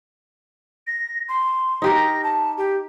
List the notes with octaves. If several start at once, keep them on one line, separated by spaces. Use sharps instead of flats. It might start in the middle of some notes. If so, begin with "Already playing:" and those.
A#6
C6
D#4 G4 A#4
A#6
A5
G4